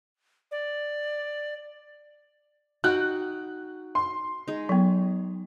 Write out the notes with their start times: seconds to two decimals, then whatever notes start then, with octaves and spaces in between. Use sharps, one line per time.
0.51 D5
2.84 D#4 F#4 G5 F#6
3.95 C6
4.48 G#3 D#4
4.69 F#3 B3